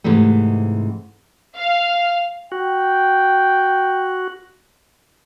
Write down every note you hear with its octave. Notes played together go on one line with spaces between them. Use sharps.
G#2 C3 E3 G#3 A3
F5
F#4 G5